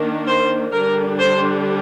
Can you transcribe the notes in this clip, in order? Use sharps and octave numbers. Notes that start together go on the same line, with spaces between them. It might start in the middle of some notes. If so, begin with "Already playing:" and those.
Already playing: D#3 A#3 D4
C5
D3 G3 D4 A#4
C5